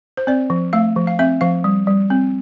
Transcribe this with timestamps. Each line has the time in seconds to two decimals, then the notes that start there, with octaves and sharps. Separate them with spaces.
0.17 C5
0.27 C4 D5
0.50 F3
0.73 A3 F5
0.96 F3
1.07 F5
1.19 C4 E5
1.41 F3 F5
1.64 G3
1.87 G3
2.10 C4